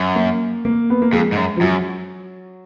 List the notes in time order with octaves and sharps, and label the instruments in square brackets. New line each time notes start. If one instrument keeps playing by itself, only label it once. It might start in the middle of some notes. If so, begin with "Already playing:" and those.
Already playing: [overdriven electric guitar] F#2
[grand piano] A#3
A#3
B3
A#3
[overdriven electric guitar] F2 [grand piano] G#3
[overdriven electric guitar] G#2
F#2
[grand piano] F3
[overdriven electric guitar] F#2 [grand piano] F#3